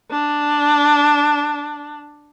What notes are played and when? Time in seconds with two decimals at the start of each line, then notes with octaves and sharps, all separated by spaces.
0.11 D4